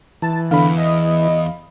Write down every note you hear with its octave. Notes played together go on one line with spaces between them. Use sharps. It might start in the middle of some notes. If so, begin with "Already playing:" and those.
E3 A5
E2 D3 F5 B5
D#5